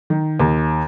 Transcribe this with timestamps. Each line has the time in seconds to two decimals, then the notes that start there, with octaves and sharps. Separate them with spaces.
0.10 D#3
0.40 D#2